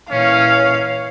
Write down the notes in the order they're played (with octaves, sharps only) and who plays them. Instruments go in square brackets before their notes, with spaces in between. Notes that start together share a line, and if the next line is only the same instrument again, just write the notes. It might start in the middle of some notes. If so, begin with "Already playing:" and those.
[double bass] A#2 E3 [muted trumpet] C#4 [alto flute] C#5 [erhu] F5